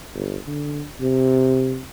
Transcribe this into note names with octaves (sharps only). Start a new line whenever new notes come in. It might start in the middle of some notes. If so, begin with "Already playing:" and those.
G1
D3
C3